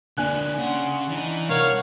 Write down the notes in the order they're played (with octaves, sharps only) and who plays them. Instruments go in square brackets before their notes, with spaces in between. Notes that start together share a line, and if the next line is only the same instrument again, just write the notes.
[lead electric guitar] D3 A#3 [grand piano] D4 G#5 F#6
[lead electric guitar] C#3 [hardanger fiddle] F#5 C6
[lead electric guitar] E3 [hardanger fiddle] D4 D#4
[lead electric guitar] C2 [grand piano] A#4 [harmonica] C#5 F5 [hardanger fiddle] F#5